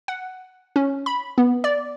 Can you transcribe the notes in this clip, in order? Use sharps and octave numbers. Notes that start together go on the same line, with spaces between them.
F#5
C#4
B5
B3
D5